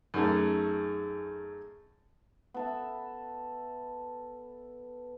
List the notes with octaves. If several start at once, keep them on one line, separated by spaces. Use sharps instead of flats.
F#2 A3 D#4 G#4 A5
B3 A4 E5